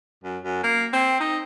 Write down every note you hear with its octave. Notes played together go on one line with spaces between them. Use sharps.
F#2
F#2
A#3
C4
D#4